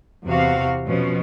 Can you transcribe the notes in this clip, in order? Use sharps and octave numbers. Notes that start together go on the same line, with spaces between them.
E2 C3 F#4 F5
B2 F3 C#4